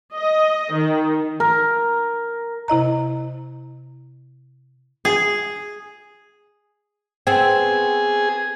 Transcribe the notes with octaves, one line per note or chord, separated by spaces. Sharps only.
D#5
D#3
A#4
C3 E4 D#5 A#5
G#4
B3 C4 G#4